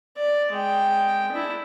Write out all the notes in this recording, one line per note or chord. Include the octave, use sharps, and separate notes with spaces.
D5
G#3 G5
D4 E4